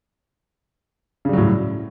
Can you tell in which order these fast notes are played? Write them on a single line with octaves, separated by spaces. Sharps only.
C#3 G3 F#3 A2